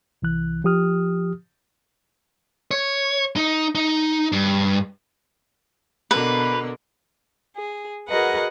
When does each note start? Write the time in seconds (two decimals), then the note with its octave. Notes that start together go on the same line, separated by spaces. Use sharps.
0.22 C2 E3 F#6
0.64 F3 G4 D#6 F6
2.71 C#5
3.36 D#4
3.75 D#4
4.32 G2
6.11 B2 D3 A#3 B4
7.56 G#4
8.08 F#4 G#4 A#4 B4 D#5 F#5